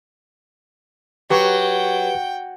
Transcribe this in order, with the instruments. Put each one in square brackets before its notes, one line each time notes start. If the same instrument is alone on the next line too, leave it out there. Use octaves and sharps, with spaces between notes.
[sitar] F#3 [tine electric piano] G4 B4 C#6 [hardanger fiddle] G5